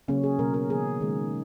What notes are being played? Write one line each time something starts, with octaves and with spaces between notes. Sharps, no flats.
C#3 F#3 A#3 C#4
G#4
B2 F#3 A#3 A#4
A#4
D#3 F#3 A#3 G#4
D#3 G#3